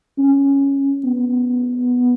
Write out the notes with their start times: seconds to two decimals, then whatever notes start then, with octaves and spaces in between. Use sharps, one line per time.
0.18 C#4
1.04 B3